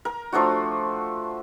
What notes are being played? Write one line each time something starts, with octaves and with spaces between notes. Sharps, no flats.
A#4
F3 A3 D4 F#4